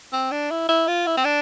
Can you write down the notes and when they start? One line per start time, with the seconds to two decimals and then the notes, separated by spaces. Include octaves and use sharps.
0.13 C4
0.31 D4
0.50 E4
0.69 E4
0.88 F4
1.06 E4
1.17 C4
1.25 D4